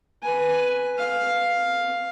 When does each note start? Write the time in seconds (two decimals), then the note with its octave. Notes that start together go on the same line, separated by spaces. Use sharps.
0.23 B4 G#5
0.98 F5